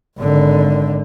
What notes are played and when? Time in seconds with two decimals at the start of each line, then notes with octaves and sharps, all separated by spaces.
0.19 G#1 D3